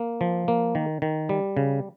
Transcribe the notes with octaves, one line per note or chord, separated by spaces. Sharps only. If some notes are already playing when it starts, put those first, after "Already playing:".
Already playing: A#3
F3
A#3
D#3
D#3
G3
C#3